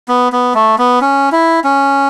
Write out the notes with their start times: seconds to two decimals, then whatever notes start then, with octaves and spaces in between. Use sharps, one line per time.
0.08 B3
0.32 B3
0.55 A3
0.78 B3
1.01 C#4
1.32 E4
1.64 C#4